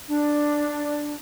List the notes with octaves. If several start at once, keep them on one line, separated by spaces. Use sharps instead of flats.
D4